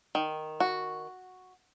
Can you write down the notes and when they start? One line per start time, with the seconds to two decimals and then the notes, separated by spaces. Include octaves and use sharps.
0.15 D#3
0.60 F#4